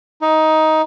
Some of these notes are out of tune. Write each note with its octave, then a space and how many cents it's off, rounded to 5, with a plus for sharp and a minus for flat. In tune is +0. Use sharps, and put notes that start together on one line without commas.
D#4 +15